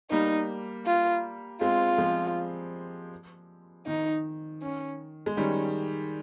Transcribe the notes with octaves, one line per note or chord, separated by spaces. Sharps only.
G3 A#3 D#4
F4
G#3 C4 F4
F3 G#3
D#3 D#4
C#4
G#3
D#3 G3 C#4